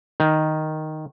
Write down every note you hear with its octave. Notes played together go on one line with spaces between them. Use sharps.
D#3